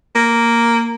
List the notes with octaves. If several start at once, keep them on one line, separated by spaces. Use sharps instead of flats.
A#3